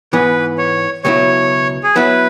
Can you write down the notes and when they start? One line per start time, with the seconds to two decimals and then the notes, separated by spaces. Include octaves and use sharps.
0.13 G#2 E3 B3 B4
0.58 C#5
1.04 C#2 B2 F#3 E4 C#5
1.84 G#4
1.96 F#3 B3 E4 B4